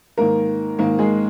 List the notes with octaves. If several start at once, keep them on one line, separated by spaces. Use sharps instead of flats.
G#2 D#3 A#3 A#4
G#2 D#3 A#3 A#4
G#3 G#4